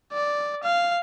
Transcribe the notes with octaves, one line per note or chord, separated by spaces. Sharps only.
D5
F5